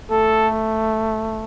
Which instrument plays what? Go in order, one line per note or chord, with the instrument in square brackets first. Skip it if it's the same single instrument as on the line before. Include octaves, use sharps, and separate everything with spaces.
[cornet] A3 [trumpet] A4